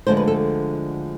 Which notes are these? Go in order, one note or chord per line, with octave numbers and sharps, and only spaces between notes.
D2 D3 F3 G#3 C5
B4
A4